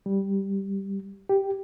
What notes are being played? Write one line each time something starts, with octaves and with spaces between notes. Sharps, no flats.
G3
G4